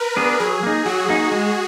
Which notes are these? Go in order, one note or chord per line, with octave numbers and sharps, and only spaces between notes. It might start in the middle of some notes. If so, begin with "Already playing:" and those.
Already playing: A#4 B4
B3 D4 G#4
F#3 G#4
A#3 D#4
F#3 F#4
A#3 D#4
G#3